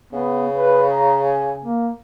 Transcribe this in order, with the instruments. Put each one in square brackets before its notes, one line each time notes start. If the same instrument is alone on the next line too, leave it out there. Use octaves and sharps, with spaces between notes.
[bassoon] C#3 [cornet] B3
[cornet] B4
A#5
G#5
A#3